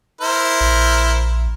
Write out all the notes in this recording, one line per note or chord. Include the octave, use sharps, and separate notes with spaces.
E4 A#4 C5
A#1